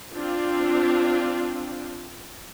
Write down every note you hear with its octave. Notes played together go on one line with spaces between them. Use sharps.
C4 D4 F4